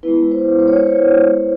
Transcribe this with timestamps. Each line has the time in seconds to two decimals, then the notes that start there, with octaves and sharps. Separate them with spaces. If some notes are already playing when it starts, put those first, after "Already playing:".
0.03 G#3 B3 E4 B4
0.31 C5
0.59 C5
0.68 C#5
0.76 C5
0.87 C#5